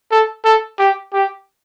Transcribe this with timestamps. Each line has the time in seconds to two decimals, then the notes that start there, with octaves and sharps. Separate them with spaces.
0.11 A4
0.44 A4
0.79 G4
1.14 G4